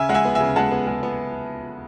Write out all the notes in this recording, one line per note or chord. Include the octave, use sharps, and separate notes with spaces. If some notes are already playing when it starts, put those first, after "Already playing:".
Already playing: C#3 E5 G#5
G#3 F#5
E5 G#5
B3
E5 G#5
C#3
G#3 F#5 A5
B3
G#3
B3